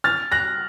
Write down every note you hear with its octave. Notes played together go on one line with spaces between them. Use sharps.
F6 A6
F#6 A#6